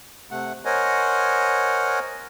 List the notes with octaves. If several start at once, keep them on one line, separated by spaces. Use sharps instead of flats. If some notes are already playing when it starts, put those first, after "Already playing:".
C3 A3 F#5
A#4 C5 C#5 D#5 F#5 G#5